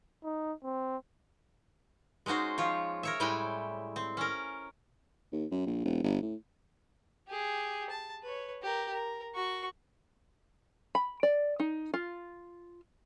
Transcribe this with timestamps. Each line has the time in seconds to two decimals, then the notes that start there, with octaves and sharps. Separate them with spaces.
0.24 D#4
0.64 C4
2.26 G#3 C#4 D#4 F#4 C5
2.58 F3 F4 C#5
3.03 A#4 C#5 E5
3.20 A2 G3 G#3 E4 G5 G#5
3.96 C4
4.17 C#4 A#4
5.32 D#2
5.52 F#2
5.67 A#1
5.85 E1
6.04 G1
6.22 A2
7.28 G4 G#4
7.90 A5
8.23 B4 C#5
8.62 G4 A#4
8.92 A#4
9.35 F#4 C#6
10.95 B5
11.23 D5
11.60 D#4
11.94 F4